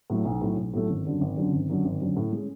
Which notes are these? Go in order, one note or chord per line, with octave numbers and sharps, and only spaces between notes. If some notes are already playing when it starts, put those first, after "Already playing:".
A2 F#3 A3
B1
A2 F#3 A3
B1
A2 F#3 A3
G#1
F#2 D3 F#3
G#1
F#2 D3 F#3
G#1
F#2 D3 F#3
G#1
F#2 D3 F#3
A2
G#3 C#4 G#4